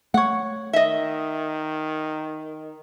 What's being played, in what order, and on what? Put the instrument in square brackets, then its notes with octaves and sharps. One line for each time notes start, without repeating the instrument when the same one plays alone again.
[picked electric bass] A3 [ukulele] C#5 F#5
[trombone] D#3 [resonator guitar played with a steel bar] D#5 E5